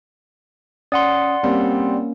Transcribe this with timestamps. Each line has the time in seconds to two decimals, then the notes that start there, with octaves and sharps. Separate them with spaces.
0.92 C#4 D5 F#5 C6 D#6
1.44 G3 A#3 C4 C#4